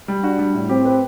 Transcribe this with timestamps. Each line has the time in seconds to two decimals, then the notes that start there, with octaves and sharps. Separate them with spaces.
0.08 G3
0.23 D4 F#4
0.39 G3
0.54 A2
0.69 C4 G4
0.85 B4